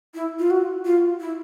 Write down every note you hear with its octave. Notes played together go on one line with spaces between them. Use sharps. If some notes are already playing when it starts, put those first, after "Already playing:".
E4
F4
F#4
F4
E4